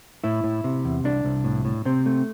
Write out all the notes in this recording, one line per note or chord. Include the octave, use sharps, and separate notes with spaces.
A2 E4
A2
C3
E2
C2 D4
C2
A2
A2
C3 C4
A3